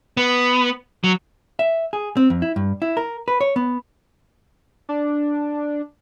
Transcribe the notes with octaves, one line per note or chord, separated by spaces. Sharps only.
B3
F#3
E5
G#4
C4
F2
E4
G2
E4
A#4
B4
C#5
B3
D4